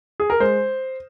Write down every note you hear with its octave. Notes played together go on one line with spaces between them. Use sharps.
G#4
A#4
G#3 C5